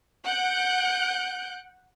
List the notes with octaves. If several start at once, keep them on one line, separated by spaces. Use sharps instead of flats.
F#5 F#6 G6 D7